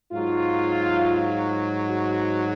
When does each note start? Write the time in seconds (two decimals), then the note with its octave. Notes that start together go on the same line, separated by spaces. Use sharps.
0.13 G#2 F#3 F4
1.90 F#4